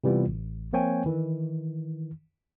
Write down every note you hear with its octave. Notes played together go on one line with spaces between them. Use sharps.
C3 E3 G3 B3 F4
A1
F3 A#3 C4 C#5 G5 G#5
D#3 E3